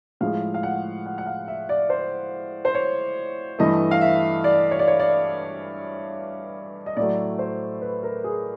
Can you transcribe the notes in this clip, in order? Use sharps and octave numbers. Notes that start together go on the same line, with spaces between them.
A2 F3 G#3 F5
F5
F#5
F#5
F#5
F5
E5
D5
C5
C5
C#5
G2 E3 A3 D#5
F5
E5
D5
C#5
D5
C#5
D5
D#5
A2 F#3 A3 D5
C5
B4
A#4
G#4